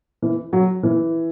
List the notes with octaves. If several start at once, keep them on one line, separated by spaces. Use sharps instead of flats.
E3
F#3
E3